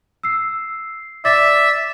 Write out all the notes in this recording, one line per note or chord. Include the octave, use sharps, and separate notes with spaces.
E6 C7
D5 E5 D6 A6